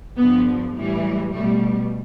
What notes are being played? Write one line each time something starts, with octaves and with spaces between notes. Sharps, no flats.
G2 D3 F3 B3
A2 E3 G3
B2 G3 A3